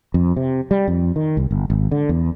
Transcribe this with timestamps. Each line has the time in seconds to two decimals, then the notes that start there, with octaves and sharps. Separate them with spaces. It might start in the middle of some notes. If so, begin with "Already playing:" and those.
0.14 F2
0.36 C3
0.71 G3
0.88 F2
1.16 D#3
1.37 C2
1.51 G1
1.70 G#1
1.91 D3
2.09 E2